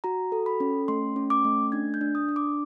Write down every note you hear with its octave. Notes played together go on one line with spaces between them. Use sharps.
F#4 A#5
A4
B5
C#4
A3 C6
C#4
D6
A3
D4 G#6
G6
D4
D#6
D4
D6